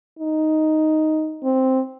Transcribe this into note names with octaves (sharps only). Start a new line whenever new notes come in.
D#4
C4